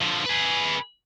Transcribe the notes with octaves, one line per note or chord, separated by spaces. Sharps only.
D3 F3
G#4 B4